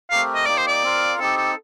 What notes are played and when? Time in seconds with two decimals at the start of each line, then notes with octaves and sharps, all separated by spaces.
0.11 A3 C4 G4 A#4 F5
0.35 D#5
0.46 A#3 D#4 G4 D5
0.57 C5
0.67 D5
0.83 C4 F4 A#4 F5
1.19 C4 D#4 G4 A4
1.37 A4